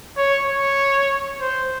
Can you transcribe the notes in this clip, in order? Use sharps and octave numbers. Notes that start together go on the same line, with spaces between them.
C#5
C#5
C5